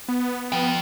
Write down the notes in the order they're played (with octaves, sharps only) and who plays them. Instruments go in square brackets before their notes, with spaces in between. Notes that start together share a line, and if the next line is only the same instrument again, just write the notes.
[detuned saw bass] B3
[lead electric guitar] F3 G5